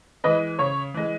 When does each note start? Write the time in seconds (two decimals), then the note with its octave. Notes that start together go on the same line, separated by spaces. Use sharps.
0.24 E3 G#3 B4 D#5
0.59 C#3 C#5
0.94 E3 G#3